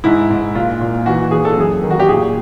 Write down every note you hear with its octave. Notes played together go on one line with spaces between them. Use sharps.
G#2 E4
G#2
A#2 F4
A#2
E3 F#4
E3 G#4
A4
F#2 G#4
D#3
F#4
G4
A#2 G#4